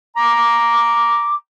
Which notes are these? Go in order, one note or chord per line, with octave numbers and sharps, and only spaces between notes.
A#5 D6